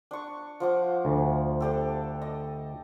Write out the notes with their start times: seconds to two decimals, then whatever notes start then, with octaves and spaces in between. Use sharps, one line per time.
0.11 D4 C#6
0.60 F3 F#5 D6
1.05 D2
1.61 D4 G4 A4
2.22 D#5